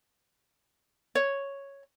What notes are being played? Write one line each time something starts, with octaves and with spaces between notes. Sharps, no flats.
C#5